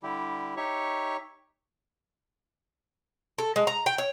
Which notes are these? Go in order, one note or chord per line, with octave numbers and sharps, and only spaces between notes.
D3 G3 E4 G4
D#4 G4 C#5 E5 C#6
A4
G#3
A#5
G5
C#5